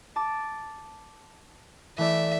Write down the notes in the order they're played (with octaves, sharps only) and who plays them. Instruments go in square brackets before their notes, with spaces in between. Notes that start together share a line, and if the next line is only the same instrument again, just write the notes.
[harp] A5 D6
[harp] E3 A3 D5 [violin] E5